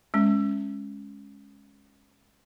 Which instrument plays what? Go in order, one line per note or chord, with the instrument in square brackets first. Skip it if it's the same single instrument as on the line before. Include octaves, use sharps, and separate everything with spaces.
[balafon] G#3 C#4